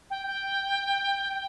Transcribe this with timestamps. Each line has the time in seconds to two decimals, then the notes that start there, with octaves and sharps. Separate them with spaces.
0.10 G5
0.27 G5